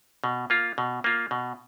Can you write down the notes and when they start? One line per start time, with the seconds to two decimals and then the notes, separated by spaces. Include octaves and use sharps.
0.24 B2
0.50 A#3 F4
0.78 B2
1.04 A#3 F4
1.31 B2